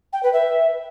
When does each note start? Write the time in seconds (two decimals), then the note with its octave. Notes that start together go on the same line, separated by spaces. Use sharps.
0.13 G5
0.23 B4
0.33 E5